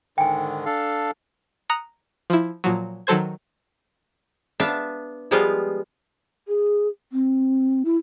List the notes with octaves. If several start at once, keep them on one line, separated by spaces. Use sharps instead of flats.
G#2 D3 D#3 G5 G#5
D4 A4 F5
A#5 D#6 F#6 A#6 C#7
F3 E4
A#2 F3 F#3
D#3 F#3 A4 C5 G#6
B3 D4 E5 F5
F3 G3 G#3 B3 F4
G#4
C4
E4